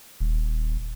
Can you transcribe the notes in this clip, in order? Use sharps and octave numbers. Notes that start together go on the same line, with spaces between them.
D#1